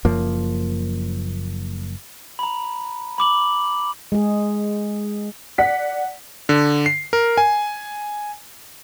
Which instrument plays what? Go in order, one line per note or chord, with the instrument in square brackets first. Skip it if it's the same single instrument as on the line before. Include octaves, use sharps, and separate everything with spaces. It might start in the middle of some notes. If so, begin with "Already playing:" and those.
[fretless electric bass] F#1 F#2 F3 A#3
[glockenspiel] A#5 B5
B5 D6 F#7
[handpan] G#3 G#4
[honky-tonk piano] D5 F#5 B6
[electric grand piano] D3
C7
A#4
G#5